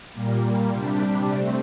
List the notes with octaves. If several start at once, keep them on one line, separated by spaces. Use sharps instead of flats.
A#2 G3 A#3
C3 G3 D4 G4
A3 C4